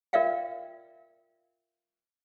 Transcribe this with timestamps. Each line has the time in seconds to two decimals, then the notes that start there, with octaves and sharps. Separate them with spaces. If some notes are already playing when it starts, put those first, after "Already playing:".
0.13 F4 A#4 D5 E5 F5 G5